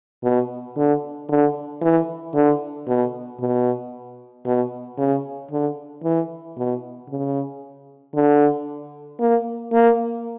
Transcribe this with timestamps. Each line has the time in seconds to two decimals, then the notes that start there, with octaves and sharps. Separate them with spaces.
0.23 B2
0.77 D3
1.29 D3
1.82 E3
2.34 D3
2.87 B2
3.40 B2
4.46 B2
4.98 C#3
5.51 D3
6.04 E3
6.57 B2
7.09 C#3
8.15 D3
9.20 A#3
9.73 A#3